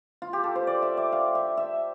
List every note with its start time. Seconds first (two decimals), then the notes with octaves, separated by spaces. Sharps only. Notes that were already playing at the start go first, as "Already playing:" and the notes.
0.22 F4
0.33 G4
0.44 A4
0.55 C5
0.67 D5
0.82 E5
0.97 D5
1.12 F5
1.35 E5
1.57 E5